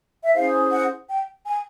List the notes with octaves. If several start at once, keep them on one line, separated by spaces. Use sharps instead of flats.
E5
C#4 E4 G#4 C5 F5
F#5
G5
G#5